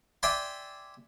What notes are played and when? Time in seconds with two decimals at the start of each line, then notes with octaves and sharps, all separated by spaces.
0.23 D5 E5 G5 G#5 C6